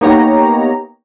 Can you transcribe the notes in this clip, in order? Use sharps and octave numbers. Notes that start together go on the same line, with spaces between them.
A#3 B3 D#4 G4 C#5 A#5